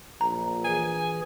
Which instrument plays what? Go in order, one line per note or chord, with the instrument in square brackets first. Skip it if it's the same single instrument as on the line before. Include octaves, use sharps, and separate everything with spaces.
[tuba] A#1 [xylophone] A#5
[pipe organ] E3 G#4 [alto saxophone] G#5